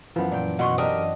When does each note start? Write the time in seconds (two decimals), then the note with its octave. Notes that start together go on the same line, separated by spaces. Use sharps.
0.16 F#2 E3 F3 B3
0.32 A#2 G5
0.59 B2 F#4 F#5 C6 C#6
0.78 C4 D4 G4 A#4 D#5 A#5